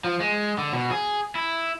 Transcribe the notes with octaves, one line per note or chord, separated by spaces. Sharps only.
F3
G#3
D3
B2
G#4
E4